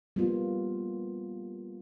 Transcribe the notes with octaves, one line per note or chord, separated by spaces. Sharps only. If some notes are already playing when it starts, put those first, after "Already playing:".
G3 A#3 B3 F4